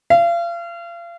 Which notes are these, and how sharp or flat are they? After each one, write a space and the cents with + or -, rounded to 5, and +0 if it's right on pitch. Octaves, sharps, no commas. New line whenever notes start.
F5 -35